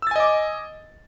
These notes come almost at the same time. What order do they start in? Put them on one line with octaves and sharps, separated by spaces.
E6 A6 G#5 D#5 D6